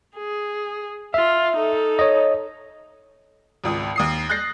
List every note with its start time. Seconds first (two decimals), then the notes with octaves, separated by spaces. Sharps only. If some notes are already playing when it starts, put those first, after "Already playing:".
0.16 G#4
1.14 F4 E5
1.56 D#4 A4
1.99 C#5 D#5
3.64 G#1 C#2 D#6
3.96 D#2 D#6 C7
4.29 F#6 G6 A6 A#6 C7